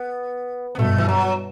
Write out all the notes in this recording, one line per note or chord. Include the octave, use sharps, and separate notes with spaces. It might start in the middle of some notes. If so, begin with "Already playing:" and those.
Already playing: B3
B3
G2 B2 A3
E3
F#3